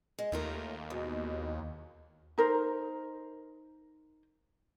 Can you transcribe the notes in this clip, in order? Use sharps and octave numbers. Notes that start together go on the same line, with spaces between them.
G#3
D#2 A3 F4 A#4
E2 G#2 B2
D#4 A#4 C5